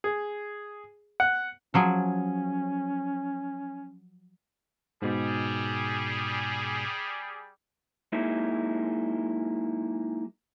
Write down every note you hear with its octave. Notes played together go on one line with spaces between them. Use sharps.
G#4
F#5
F3 F#3 C#4 G#4
G#2 B2 G3 G#4
F#3 G#3 A#3 D#4 E4